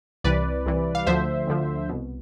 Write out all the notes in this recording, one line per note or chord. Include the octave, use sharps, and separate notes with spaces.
C2 C3 E3 B4 D5
C2 C3 E3
F5
D2 D3 F3 C5 E5
D2 D3 F3
C2 B2